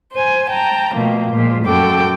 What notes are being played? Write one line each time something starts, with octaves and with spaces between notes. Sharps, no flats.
C5 G#5
G5 A5 A#5
B2 F3 A3 A#3
A#2 F3 G#3
F#2 F#4 A4 G5 D6